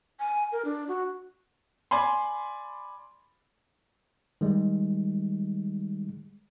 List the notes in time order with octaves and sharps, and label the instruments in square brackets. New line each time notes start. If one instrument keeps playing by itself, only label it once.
[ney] G#5
A#4
D4
F#4
[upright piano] D5 G#5 B5 C6
[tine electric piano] D#3 G3 G#3